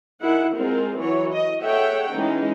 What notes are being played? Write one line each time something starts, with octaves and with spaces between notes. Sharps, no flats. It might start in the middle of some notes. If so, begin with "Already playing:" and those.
D#3 E4 G#4 F#5
G#3 C4 F4 A#4
E3 F#3 F#4 C#5
D#5
G#4 A4 C#5 E5 F#5 G5
E3 G#3 C#4 D#4